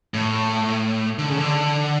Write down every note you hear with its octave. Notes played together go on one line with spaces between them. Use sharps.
A2
D3
C#3
D3